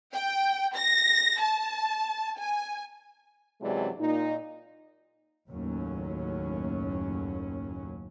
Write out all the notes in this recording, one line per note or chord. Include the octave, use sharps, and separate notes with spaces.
G5
A#6
A5
G#5
F#2 C3 E3 F#3 G#3 D5
A#2 D#4
F#1 D#2 A2 F#3 C#4